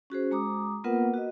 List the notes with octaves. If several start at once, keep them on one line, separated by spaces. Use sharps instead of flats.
C#4 F#4 G#4 C5
G#3 A#5 D6 D#6
A#3 B3 F4 A#4 B4 F#5
F#4 D#5